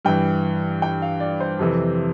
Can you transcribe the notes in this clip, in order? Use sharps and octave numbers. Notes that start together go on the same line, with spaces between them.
G2 E3 G5
G5
F5
D5
C5
F2 C3 E3